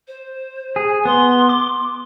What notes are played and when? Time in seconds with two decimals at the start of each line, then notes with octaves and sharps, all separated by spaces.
0.07 C5
0.76 G#4
1.05 B3 C6
1.49 D6